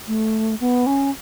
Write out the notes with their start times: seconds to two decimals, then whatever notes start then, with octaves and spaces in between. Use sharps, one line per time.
0.07 A3
0.60 B3
0.86 C#4